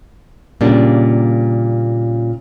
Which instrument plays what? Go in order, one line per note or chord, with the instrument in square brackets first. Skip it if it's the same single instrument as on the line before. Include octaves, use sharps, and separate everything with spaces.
[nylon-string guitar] A#2 G3 D4 [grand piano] C#3 A#3